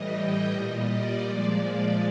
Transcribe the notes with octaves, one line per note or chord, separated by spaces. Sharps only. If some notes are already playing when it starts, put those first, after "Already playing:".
Already playing: A2 E3 G3 D#5
G5
A#2 G3 D#5
D5
A#2 F3 G#3